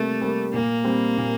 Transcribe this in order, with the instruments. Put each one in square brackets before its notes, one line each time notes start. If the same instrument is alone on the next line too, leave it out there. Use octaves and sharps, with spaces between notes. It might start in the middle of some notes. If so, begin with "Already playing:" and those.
Already playing: [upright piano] C3 G3 A#3 [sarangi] A3
[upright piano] G3 A#3
[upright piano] A#2 [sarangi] A#3
[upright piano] G3 C4
A#2